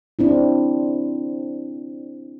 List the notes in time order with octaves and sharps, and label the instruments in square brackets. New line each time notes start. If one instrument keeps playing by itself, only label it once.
[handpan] C4 D4 E4